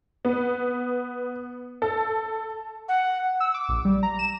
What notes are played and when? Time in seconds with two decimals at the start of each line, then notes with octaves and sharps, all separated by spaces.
0.25 B3
1.82 A4
2.89 F#5
3.40 E6
3.54 D6
3.69 A#1
3.85 G3
4.03 A#5
4.19 E7